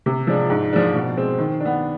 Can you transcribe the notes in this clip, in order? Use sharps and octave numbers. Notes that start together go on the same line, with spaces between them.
C3
F3 G#3 D4
G#2
F3 G#3 D4
B2
G#3 C4
D#3
D4
B3